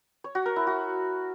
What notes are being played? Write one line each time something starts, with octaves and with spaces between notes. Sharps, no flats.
C#5
F#4
A#4
E4
F#4